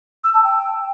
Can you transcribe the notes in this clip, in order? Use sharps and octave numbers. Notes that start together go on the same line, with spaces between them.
E6
A5
G5